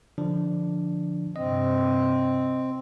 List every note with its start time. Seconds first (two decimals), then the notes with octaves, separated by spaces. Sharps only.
0.18 D3 F3 D4
1.36 G2 C3 C4 D#5